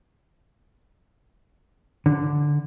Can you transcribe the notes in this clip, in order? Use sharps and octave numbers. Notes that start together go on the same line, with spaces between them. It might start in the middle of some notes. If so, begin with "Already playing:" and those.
D3